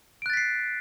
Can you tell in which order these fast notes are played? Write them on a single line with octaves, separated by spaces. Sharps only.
D7 F#6 A6 B6 C7